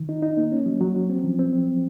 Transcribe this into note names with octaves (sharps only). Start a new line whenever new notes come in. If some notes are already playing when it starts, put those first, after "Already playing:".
Already playing: D#3
D#4
D#4
A#3
C#4
F#3
F#3
F#3
C4
F3
C4